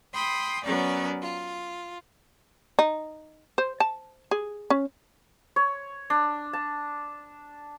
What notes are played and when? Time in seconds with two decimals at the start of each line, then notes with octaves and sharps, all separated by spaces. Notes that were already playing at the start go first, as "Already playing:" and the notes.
0.13 G5 B5 C6 D#6
0.63 F#3 B3 C#4 A#4 D5
1.22 F4
2.79 D#4
3.58 C5
3.80 A5
4.31 G#4
4.70 C#4
5.56 C#5
6.10 D4
6.53 A5